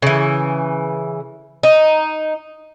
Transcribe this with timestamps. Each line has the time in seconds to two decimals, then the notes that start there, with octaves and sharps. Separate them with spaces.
0.02 C#3 E3
1.63 D#4